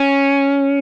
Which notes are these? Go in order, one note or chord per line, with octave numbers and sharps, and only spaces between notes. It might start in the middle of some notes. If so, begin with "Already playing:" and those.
Already playing: C#4